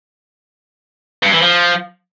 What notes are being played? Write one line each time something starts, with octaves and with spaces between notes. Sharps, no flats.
G2
E3
F3